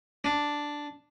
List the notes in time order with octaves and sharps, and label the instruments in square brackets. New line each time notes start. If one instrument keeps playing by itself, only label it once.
[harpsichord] D4